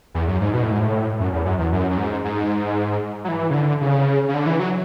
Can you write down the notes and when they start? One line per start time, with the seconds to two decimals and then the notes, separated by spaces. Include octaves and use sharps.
0.14 E2
0.28 F#2
0.40 G#2
0.54 B2
0.63 A2
0.72 G#2
0.80 A2
1.20 F#2
1.33 E2
1.45 F#2
1.59 E2
1.72 F#2
1.90 F#2
1.98 G#2
2.24 G#2
3.24 F#3
3.28 E3
3.50 C#3
3.54 D3
3.81 C#3
4.29 C#3
4.34 D3
4.46 E3
4.59 F#3